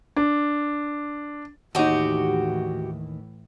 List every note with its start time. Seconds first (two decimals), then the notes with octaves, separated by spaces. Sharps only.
0.16 D4
1.75 D#2 A2 E3 D#4 F#4 G4